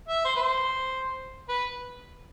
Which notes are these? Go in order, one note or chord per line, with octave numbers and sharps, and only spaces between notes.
E5
C5
B4
C5
B4